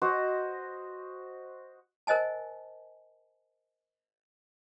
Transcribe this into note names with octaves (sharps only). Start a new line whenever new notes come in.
F#4 C5 D#5
A#4 C5 D#5 G#5 A5